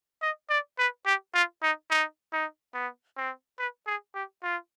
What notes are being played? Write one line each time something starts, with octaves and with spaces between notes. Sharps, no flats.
D#5
D5
B4
G4
F4
D#4
D#4
D#4
B3
C4
B4
G#4
G4
F4